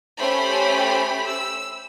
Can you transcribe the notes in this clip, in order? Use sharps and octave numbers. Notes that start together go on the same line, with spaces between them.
A3 C#4 G4 C5 B5
E6